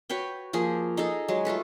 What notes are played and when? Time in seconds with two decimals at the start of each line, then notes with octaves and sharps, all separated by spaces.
0.10 F#4 B4 C#5 G5
0.53 F3 A#3 G#4
0.97 D#4 G#4 A4
1.28 F#3 G#3
1.45 A3 F4 A4 B4